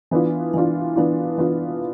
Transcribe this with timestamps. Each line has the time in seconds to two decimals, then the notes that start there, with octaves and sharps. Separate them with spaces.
0.11 E3 B3 D4 F4
0.54 E3 B3 D4 F4
0.96 E3 B3 D4 F4
1.38 E3 B3 D4 F4